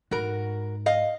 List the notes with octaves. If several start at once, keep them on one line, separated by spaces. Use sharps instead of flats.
G#2 F#4 A#4
D#5 F5